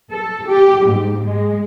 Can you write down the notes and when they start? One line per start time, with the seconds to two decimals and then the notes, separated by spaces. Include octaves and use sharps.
0.12 A4
0.48 G4
0.86 G#2
1.26 G#3